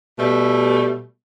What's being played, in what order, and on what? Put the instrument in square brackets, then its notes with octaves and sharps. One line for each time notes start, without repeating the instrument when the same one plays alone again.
[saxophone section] B2 G3 A3